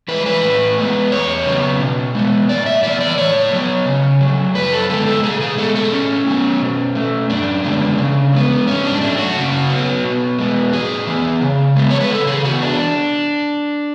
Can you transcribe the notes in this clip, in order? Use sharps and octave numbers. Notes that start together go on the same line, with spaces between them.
E3 G#3 B4
B4
A2
G#3 B3
E2 C#5
C#3 F#3 B3
B2
G#3 B3
A2 D5
E5
E3 B3 D5
D5
A2 C#5
F#3 B3
C#3
F#3 A3
F#2 B4
A4
D3 G#3 B3 A4
A4
B2 G#4
G#4
G#3 B3 A4
A4
A2 C#4
F#3 B3
B2
A3
F#2 D4
D3 G#3 B3
C#3
G#3 B3
G#2 C#4
D4
F#3 A3 D4
F#4
C#3
F#3 B3
B2
G#3 B3
A2 G#4
E3 B3
C#3
G#3 B3
C#5
B4
C#3 A4
G#4
E3 B3 F#4
D4